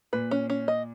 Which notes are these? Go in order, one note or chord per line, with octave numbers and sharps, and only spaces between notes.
A#2 B4
C#4
C#4
D#5